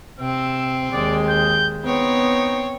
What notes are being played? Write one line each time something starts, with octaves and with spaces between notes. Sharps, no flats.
C3 C4 E6
D#2 G#3 D5
G6
B3 C4 D#4 C#5